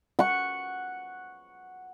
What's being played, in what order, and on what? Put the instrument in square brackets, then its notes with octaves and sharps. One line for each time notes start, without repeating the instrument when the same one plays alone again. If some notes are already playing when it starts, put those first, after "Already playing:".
[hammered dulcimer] F#5 C#6